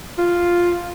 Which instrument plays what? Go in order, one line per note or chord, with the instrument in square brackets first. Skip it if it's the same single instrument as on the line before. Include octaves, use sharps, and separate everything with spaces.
[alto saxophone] F4